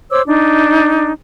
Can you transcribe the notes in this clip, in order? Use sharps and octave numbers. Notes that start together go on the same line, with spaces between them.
C5 C#5 D6 E6
D4 D#4